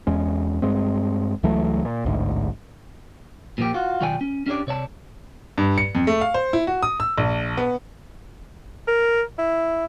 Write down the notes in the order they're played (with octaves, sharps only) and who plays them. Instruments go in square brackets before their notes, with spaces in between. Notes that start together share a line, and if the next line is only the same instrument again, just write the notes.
[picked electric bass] E2 G#3 C#4
G2 G#3 C4
C#2 E3 F#3 A3
A#2
A1 D2 G#2
[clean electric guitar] A#2 F3 G4
F4 F#4
B1 D#3 F4 D5 G5 G#5
C#4
C#4 D4 G4 C#5 D5
C3 C#5 D5 A5
[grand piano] G2
C#7
F2
A3
F5
C5
E4
F#4
D#6
E6
A#1
B3
[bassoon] A#4
E4